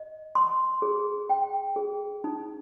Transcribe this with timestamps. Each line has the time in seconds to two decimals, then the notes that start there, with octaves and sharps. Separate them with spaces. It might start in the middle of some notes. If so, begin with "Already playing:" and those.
Already playing: D#5
0.35 C6
0.82 G#4
1.30 G5
1.76 G#4
2.24 D#4